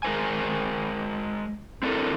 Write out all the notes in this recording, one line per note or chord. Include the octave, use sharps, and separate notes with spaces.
G#3 A#4 C5 G#5
C4 D4 E4 A4 A#4